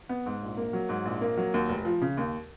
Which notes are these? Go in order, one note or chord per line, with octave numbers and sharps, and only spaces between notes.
B3
G#2
A#1
A#3
F#3
G#2
A#1
A#3
F#3
D#2
F1
F3
C#3
D#2